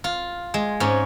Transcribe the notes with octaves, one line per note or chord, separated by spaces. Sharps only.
F4
G#3
G#2 C#4